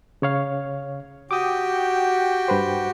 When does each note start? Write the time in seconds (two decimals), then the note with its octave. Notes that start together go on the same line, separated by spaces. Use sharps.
0.22 C#3 C#5 F5
1.31 F#4 G4 G5 D6 D#6
2.48 G2 B4 C5